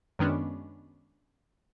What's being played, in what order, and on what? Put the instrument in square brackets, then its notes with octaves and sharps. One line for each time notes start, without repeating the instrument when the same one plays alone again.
[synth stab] F#2 D#3 G#3 B3 C#4 D4